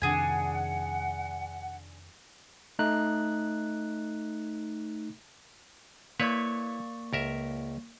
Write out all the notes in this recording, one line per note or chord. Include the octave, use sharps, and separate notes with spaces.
F2 C3 D#3 D4 G#4 F#5 G#5
A3 D#4 F#6
A#3 E4 B4 C#5 D5 C#6
C#2 A#4 E5